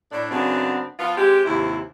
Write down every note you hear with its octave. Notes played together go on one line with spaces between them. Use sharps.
A2 D4
F#2 C#3 B3 C4 D4
F3 B3 F4
G#3 C4 G4
D#2 G#2 C3 E4